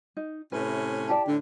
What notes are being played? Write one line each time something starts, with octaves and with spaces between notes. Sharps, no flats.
D#4
A2 C3 C#4 B4
E4 G4 D5 A5
A2 D3 D4